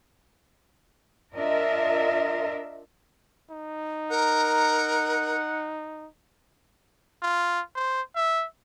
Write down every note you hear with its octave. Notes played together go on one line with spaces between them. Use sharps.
D4 F4 A#4 D#5 E5
D#4
A#4 F#5
F4
C5
E5